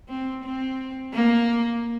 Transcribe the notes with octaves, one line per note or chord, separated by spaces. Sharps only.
C4
C4
A#3